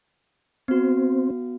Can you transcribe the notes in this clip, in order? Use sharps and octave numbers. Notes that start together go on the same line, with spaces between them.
B3 C4 F#4